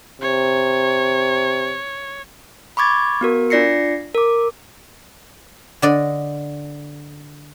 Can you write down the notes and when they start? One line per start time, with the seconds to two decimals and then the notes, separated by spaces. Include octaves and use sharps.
0.21 C3 C#5
2.77 B5 C#6 D6 G#6 A6
3.21 B3 F#4 A#4
3.50 D4 F4 D5 A#6 C7 C#7
4.14 A#4 D6
5.82 D3 D5 D#5